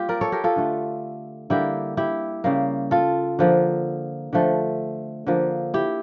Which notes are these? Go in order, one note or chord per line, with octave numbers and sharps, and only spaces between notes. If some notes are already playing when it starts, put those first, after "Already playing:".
Already playing: G3 A#3 F4 G4
A#4 D5
A4 C#5
G4 A#4
F4 A4
D3 A3
D3 G3 A#3 E4 G4
E4 G4
C#3 G3 A#3
F4 A4
D3 F3 A#3
D3 F3 A3
D3 F3 A#3
E4 G4